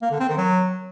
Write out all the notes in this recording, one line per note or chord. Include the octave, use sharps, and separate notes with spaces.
A#3
D3
C4
D#3
F#3